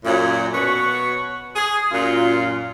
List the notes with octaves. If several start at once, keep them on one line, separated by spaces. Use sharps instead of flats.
F#2 A#2
B2 F#4 B4 C#5
G#4
F#2 A#2 F4